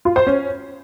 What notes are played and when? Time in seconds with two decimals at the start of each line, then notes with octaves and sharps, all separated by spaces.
0.05 F4
0.16 C5
0.27 C#4